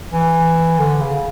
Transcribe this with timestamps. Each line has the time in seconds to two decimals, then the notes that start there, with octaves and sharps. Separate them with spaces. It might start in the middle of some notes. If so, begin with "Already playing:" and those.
0.13 E3
0.79 D3
1.01 C#3